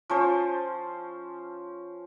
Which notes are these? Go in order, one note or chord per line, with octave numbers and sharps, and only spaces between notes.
F3 C#4 C5